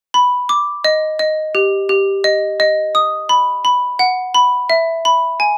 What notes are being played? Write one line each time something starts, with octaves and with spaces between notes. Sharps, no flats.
B5
D6
D#5
D#5
G4
G4
D#5
D#5
D#6
B5
B5
F#5
B5
E5
B5
G#5